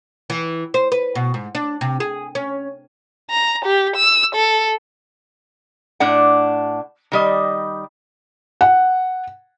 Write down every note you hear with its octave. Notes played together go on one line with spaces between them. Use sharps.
E3
C5
B4
B2
G#2
D4
C3
G#4
C#4
A#5
G4
E6
A4
A2 D4 F#5
D#3 G3 D#5
F#5